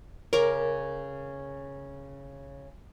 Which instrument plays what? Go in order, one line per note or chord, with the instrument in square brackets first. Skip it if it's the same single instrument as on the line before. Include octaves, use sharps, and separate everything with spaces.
[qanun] C#3 C#4 D6 [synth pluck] A#4